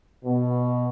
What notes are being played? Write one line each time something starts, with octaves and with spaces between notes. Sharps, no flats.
B2